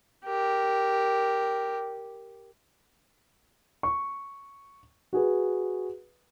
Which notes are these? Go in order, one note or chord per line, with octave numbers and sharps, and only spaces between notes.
G4 A#4
C#6
F#4 G#4 B4